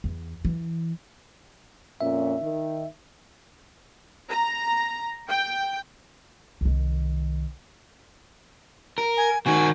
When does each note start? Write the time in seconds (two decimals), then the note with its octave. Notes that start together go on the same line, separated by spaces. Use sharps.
0.04 E2
0.45 E3
2.01 F2 A#2 C#4 E5
2.42 D#3
4.30 A#5
5.28 G5
6.61 C2 D#3
8.98 A#4
9.17 G#5
9.46 D#3 F#4 G#5